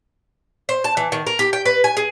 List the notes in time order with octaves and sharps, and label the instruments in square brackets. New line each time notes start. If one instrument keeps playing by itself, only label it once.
[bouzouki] C5
A5
E3
D#3
A#4
G4
G5
B4
G#5
G#4